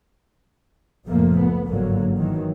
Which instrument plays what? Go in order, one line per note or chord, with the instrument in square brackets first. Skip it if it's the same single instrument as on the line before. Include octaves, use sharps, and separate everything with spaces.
[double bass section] F#1 C#2 A#2 F3 A3 A#3
B3
G1 G#2 D3 F#3 A#3
D#3 E3 F#3